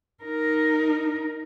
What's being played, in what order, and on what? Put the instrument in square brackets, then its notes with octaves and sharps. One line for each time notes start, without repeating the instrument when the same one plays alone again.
[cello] D#4 A#4